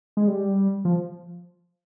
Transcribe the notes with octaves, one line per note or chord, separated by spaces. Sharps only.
G#3
G3
F3